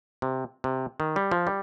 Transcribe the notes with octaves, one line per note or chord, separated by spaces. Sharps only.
C3
C3
D#3
G3
F3
G3